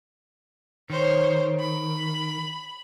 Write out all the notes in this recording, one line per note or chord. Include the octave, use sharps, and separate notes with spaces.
D#3 C5 C#5
B5